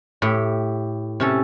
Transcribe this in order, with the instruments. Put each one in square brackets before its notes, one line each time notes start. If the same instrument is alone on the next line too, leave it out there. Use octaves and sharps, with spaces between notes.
[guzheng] A2 G4
C3 C#4 A4